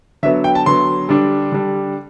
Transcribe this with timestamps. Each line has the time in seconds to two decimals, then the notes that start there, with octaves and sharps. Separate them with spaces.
0.23 D3 F#3 B3 E5
0.44 G5
0.55 A5
0.66 D3 F#3 B3 C6
1.09 D3 G3 D4
1.52 D3 G3 D4